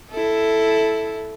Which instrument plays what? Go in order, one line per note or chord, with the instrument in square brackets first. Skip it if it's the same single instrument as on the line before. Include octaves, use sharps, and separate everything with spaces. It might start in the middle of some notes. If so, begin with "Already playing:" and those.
[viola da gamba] E4 A4